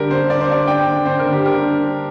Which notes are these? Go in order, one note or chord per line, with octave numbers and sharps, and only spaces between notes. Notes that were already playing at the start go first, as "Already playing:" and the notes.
Already playing: D3 G3 D4 G4 A#4
D3 C5
D4 D5
C5
D4 D5
D4 G5
D3
D3 C5
A#4
D3
G4
G3 A#4
D4
D4